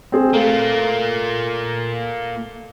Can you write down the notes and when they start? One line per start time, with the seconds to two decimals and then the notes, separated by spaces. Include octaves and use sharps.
0.12 C4 G#4 C5
0.33 A3 A#3 F4